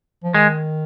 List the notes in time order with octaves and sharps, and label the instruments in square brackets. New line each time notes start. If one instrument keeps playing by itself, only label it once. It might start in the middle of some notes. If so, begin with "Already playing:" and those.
[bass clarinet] F3
[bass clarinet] D#3 [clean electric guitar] G#3